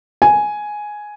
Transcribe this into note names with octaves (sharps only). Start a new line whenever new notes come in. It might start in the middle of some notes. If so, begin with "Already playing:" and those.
G#5